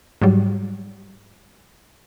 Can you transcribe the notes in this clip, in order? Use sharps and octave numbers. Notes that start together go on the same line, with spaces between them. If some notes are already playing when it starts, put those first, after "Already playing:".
G#2 F#3 G3